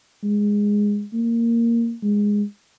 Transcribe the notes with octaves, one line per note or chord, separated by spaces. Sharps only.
G#3
A#3
G#3